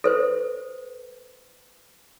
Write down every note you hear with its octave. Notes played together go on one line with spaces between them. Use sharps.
A4 B4 C5